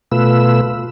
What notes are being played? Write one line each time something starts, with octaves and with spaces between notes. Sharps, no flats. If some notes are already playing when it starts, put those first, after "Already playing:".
B2 A3 F4 B4 E6